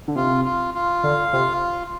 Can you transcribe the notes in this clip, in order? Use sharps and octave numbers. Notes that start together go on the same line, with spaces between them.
D3
C3 F4
F4
F4
D3 F5
C3 F4